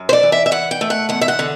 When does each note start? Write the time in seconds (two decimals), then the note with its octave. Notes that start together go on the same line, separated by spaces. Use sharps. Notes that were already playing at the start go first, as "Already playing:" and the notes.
Already playing: F#2
0.09 C5
0.13 D5
0.23 E3
0.32 E5
0.46 E5
0.51 E3 F#5
0.71 G5
0.81 A3
0.90 F#5
1.09 E2 F#5
1.21 E5
1.28 F#5
1.39 D3